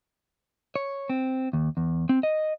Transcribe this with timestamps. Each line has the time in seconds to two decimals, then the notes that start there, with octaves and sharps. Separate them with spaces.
0.76 C#5
1.10 C4
1.53 D#2
1.77 E2
2.09 C4
2.23 D#5